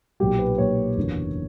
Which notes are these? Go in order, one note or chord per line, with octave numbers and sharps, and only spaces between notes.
B1 A#2 F#3 A#3 G4
B4
B1 A#2 F#3 A#3 C#5
F#1 E2 D3 F#3 A#3